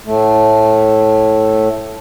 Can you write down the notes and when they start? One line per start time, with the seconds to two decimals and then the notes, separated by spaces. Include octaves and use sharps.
0.06 A2 A3